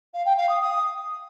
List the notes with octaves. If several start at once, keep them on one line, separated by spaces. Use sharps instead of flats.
F5
G5
F5
D#6
D#6